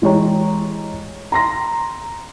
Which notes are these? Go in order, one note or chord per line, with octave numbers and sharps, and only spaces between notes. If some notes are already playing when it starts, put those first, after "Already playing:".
E3 G#3 G4 C#5 A#5
A#5 C6 A#6